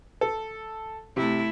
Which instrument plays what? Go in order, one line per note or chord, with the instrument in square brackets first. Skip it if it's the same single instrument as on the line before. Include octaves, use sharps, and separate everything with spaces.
[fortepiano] A4
[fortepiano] C3 [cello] A3 E4